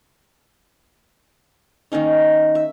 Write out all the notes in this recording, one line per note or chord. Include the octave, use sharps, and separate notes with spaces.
D#3 A#3 C#4 D#4
E5